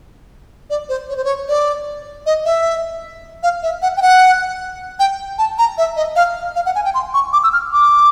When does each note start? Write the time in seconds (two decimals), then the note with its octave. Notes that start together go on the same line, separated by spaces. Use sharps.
0.70 D5
0.89 C5
1.09 C#5
1.17 C5
1.24 C#5
1.49 D5
2.26 D#5
2.45 E5
3.43 F5
3.63 E5
3.82 F#5
3.97 G5
4.02 F#5
4.99 G5
5.38 A5
5.58 A#5
5.78 E5
5.96 D#5
6.16 F5
6.56 F5
6.66 F#5
6.75 G#5
6.85 G5
6.94 C6
7.14 C#6
7.33 D6
7.44 E6
7.53 F6
7.73 D6